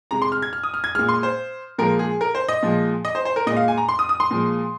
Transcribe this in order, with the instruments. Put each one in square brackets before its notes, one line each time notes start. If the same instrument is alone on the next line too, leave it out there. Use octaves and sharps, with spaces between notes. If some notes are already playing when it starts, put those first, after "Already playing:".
[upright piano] C3 G#3 A#5
C6
F6
G#6
F6
D#6
F6
G#6
A#2 G#3 F6
C6
C5
A#2 F3 G#3 A#4
G#4
A#4
C5
D#5
A#2 F3 G#3
D#5
C5
C5
A#4
A#2 G#3 D#5
F5
G#5
A#5
C6
D#6
D#6
C6
A#2 F3 G#3